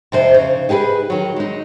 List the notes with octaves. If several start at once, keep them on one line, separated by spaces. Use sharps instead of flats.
F2 C3 C5
C#3 D#4
D#4 G4 G#4 A#4 B4
D#3 F#3
G#3 D#4